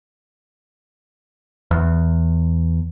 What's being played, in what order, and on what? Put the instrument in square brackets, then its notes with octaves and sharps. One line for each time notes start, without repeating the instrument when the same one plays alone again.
[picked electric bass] E2